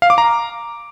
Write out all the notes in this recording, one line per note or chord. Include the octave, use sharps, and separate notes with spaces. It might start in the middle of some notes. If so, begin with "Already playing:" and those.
F5
D6
A#5